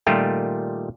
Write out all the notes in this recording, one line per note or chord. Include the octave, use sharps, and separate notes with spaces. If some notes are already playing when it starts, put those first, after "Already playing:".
A#2 D#3 G3 A3 F4 G4